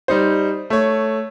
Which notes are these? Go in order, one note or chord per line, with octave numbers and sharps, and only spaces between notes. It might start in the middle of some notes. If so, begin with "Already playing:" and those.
G3 D#4 C5
A3 C#5